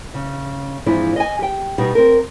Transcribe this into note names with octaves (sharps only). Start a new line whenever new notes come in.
C#3
G#2 E3 F3 C4 D4 E4
D#5 G#5
G4 G5
B2 G3 D#4
C4 A#4